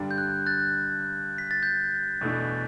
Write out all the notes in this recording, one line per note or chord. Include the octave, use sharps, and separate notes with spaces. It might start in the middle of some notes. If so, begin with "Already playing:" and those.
Already playing: G2 D3 G3 D4
G6
F#6
F#6 A6
B6
A6
G6
E2 B2 A3 D4